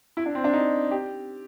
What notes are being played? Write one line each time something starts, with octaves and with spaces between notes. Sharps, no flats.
E4
D4
C4
D4
D#4
G4